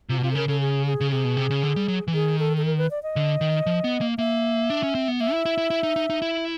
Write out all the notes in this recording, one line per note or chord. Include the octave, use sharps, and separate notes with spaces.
C3 F4
B2 F#4
C3 F4
A4
C#3 A#4
C#3 A4
G#4
G#4
C#3
C3 G#4
B2
C3
C#3
D3
G3
F#3
E3
D#3 G#4
A4
A4
A#4
B4
D5
D#5
D3
D#3
F3
B3
A#3
A#3 E5
D4
C#4
C4
B3
A#3 E5
E4
E4
E4
E4
D#4
D#4
D#4
E4